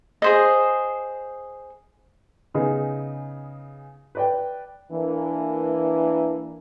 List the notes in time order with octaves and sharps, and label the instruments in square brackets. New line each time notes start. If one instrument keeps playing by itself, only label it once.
[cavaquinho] G#4 C5 D#5
[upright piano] C#3 B3 D#4 G#4
B4 D5 G5
[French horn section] E3 A#3 D4